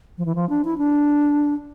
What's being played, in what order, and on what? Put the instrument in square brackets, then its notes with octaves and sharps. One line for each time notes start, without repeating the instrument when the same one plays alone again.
[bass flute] F3
E3
F3
D4
E4
D4